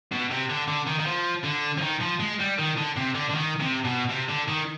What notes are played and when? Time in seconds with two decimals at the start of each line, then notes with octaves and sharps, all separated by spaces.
0.12 B2
0.31 C3
0.49 D3
0.68 D3
0.87 D#3
1.00 D#3
1.07 F3
1.44 D3
1.78 F3
1.82 D#3
2.01 F3
2.20 G#3
2.40 G3
2.59 D#3
2.78 D3
2.97 C3
3.15 D3
3.29 D3
3.35 D#3
3.60 C3
3.85 B2
4.10 C3
4.29 D3
4.48 D#3